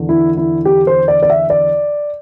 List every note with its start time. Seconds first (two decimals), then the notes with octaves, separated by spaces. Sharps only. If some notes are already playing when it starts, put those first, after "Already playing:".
Already playing: E2 D3
0.09 E4
0.37 E4
0.65 G4
0.87 C5
1.08 D5
1.23 D5
1.30 E5
1.50 D5